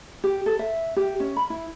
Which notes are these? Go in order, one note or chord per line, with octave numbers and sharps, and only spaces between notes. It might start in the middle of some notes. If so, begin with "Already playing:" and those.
G4
A4
E5
G4
C#4
B5
E4